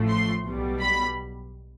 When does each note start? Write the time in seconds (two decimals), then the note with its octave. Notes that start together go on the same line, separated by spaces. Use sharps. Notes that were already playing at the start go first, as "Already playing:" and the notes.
Already playing: A1 A2 F3 A3
0.09 C6
0.45 B1 B2 G3
0.82 B5